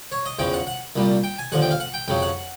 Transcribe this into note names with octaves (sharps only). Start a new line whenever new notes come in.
C#5
D#5
E2 C#3 F3 G5
F#5
F#5
C2 A#2 G3
G5
G#5
D#2 D3 F3 F#5
G5
F5
F#5
G5
F2 C#3 F#3 G5
F#5